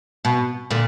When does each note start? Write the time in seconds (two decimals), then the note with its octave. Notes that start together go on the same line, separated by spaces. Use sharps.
0.25 B2
0.70 A#2 D3